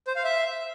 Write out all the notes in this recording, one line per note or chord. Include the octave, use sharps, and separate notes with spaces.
C5
F5
E5